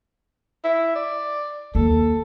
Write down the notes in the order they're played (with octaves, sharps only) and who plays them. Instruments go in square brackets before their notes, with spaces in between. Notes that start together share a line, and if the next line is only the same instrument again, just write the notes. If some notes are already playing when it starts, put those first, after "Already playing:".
[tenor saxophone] E4
D5
[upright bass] D#2 [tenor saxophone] A4